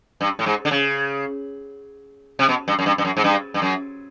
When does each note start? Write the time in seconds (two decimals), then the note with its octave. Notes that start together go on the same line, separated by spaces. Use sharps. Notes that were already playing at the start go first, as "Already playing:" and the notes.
0.21 G2
0.39 A2
0.46 G#2
0.65 D3
0.71 C#3
2.39 C3
2.49 B2
2.68 G2
2.79 F#2
2.86 G2
2.98 G2
3.05 F#2
3.17 G#2
3.24 G2
3.54 G2
3.62 F#2